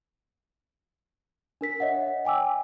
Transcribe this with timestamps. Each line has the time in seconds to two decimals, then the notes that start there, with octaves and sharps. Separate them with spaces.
1.61 D4 A#4 B6
1.80 C#5 D#5 E5 F#5
2.25 G5 G#5 D6 E6